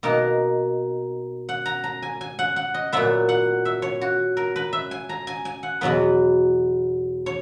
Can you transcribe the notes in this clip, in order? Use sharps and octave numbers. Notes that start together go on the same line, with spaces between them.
B2 A#3 D#4 A#4
F#5
A#5
A#5
G#5
G#5
F#5
F#5
D#5
A#2 F#3 B3 E5
F#5
E5
C#5
F#4
A#4
B4
E5
G#5
A#5
G#5
G#5
F#5
E2 B2 F#3 B3 B4
C#5